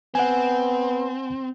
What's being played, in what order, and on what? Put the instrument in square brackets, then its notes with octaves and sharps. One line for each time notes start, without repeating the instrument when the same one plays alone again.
[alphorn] B3 [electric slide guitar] C4 [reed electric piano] F#5 G#5